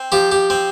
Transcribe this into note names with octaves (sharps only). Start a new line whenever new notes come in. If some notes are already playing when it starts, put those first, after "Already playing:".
Already playing: C4
F3 G4
G4
C4